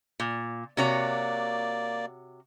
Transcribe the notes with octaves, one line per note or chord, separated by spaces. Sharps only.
A#2
C3 A#3 F#4 C#5 D5